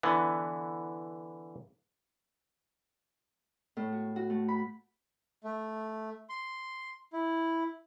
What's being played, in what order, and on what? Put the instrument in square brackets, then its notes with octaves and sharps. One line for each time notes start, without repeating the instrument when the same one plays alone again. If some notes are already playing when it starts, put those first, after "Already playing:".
[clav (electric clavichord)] D3 E3 B3
[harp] A2
F#4
F#4
A3
B5
[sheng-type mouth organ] A3
C6
E4